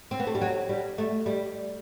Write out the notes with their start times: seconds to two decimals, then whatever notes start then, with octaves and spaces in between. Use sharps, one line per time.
0.11 C4
0.20 B3
0.27 A3
0.35 G3
0.41 F#3
0.69 G3
0.98 A3
1.26 G3